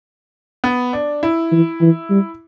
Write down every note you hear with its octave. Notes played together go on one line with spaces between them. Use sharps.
B3
D4
E4
E3
E3
G3